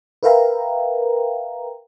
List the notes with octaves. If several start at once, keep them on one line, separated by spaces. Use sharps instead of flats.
A#4 B4 E5 F5 G5 A#5